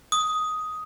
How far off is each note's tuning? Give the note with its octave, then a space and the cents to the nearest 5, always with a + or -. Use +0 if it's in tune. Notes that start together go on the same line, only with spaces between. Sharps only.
D#6 +10